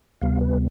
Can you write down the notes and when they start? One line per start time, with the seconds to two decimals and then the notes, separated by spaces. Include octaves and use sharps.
0.21 D2 C3 G3 B3 F5
0.41 B4